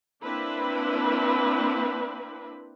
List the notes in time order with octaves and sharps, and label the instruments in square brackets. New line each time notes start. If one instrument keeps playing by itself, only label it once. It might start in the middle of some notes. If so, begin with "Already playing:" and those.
[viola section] A#3 C4 D4 E4 B4